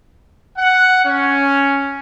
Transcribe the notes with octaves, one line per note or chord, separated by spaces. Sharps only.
F#5
C#4